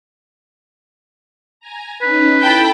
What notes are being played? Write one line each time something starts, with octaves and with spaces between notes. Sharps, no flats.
G#5 A#5
C#4 D#4 B4
E4 A4 G5 A5 B5